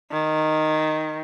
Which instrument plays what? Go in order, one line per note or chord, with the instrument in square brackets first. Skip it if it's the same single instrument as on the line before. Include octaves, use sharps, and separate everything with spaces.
[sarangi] D#3